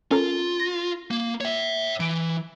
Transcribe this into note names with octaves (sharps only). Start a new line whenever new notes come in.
C#4 F4 A4 A#4
A#6
A#3
C#5 E5
E3 D7